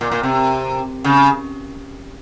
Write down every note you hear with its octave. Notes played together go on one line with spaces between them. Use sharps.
A#2
A#2
C3
C#3